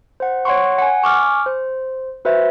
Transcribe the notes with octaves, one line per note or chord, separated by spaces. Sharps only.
C5 F#5
C#5 F#5 C6 C#6
F#5 G#5
G#5 C#6 D6 F6
C5
F#4 B4 C5 E5